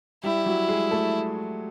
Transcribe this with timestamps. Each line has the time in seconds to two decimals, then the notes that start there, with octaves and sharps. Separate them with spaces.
0.24 G3 E4 G4
0.46 F#3 F#4
0.68 G#3 G#4
0.91 A3 A4